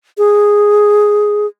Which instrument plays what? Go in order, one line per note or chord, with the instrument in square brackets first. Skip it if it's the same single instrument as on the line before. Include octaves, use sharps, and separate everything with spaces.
[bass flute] G#4